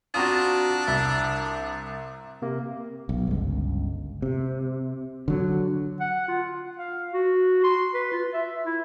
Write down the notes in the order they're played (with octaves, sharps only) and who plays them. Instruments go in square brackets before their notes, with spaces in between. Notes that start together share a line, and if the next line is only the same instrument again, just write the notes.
[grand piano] C4 F4 [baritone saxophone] D4 [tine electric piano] F#4 A#5 D#6
[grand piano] C2 [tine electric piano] E5
[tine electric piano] C3 A#3
[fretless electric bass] B1
G1 C#2
C3
D3 F#3
[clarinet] F#5
F4
F5
F#4
C6
B4
F4
E5
E4